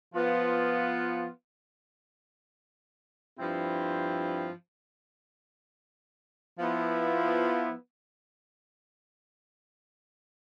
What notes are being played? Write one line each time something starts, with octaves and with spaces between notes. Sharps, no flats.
F3 B3 F4
G2 F3 C4 E4
F3 B3 E4